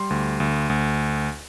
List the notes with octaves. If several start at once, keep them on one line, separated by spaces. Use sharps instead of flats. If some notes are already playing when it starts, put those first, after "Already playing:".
Already playing: G3 C6
D2
D2
D2